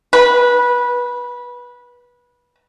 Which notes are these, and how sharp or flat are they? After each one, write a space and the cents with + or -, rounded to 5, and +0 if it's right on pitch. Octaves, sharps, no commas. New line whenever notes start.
B4 -20